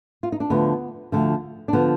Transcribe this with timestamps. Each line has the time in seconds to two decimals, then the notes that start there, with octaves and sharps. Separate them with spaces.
0.23 F4
0.32 D#4
0.40 D4
0.50 D2 D3 F3 B3
1.12 D2 D3 F3
1.68 D4
1.73 D3 F3 B3